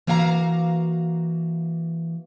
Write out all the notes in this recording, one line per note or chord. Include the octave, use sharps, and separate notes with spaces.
E3 A#3 F#4 F5 G5 A#5